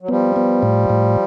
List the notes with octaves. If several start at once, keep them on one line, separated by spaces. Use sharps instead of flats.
F#3
F3 G3 B3
B3
A2
A2